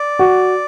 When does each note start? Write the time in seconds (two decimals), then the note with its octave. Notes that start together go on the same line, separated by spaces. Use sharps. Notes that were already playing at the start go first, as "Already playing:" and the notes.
Already playing: D5
0.19 F#4